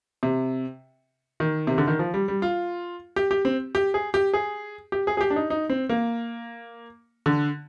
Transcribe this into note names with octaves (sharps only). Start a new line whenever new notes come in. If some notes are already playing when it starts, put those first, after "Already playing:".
C3
D#3
C3
D3
D#3
F3
G3
G3
F4
G4
G4
C4
G4
G#4
G4
G#4
G4
G#4
G#4
G4
D4
D#4
D#4
C4
A#3
D3